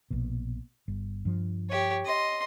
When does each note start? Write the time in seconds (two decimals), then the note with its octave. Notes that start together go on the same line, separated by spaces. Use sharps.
0.10 A#1 B2
0.88 G1
1.25 G2 F3
1.69 G4 C#5
2.05 D#5 C6